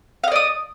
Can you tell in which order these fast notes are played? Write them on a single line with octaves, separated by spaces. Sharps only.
F5 D#5 D5 D#6